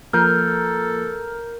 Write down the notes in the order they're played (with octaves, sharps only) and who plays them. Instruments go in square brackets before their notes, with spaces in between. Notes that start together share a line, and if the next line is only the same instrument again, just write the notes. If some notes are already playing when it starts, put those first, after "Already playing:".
[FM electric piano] F3 A#3 [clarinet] A4 [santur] A#4 [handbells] F6 G6